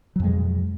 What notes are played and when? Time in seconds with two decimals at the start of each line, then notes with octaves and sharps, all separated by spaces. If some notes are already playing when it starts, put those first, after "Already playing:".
0.16 F#3
0.20 F2
0.24 G#3
0.28 B2